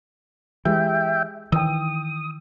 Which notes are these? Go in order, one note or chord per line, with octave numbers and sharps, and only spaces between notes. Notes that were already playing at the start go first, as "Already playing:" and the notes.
E3 G#3 G4 E5 G5
D#3 E3 G5 D#6 E6